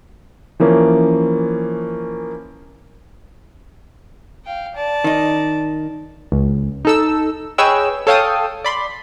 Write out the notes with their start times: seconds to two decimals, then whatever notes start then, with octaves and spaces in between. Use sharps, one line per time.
0.60 E3 F3 A#3 C#4
4.45 F5 G5
4.76 D5 A5
5.04 D#3 D#4
6.32 C#2
6.85 D#4 A4 E6
7.58 G#4 B4 C#5 D#5 G5 E6
8.07 A4 C#5 F5 G5 A5 D#6
8.64 D5 B5 C6